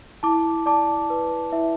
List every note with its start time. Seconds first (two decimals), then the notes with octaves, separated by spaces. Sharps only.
0.23 E4 A5 D6
0.66 D5 A5 D6
1.10 B4
1.52 E4 E5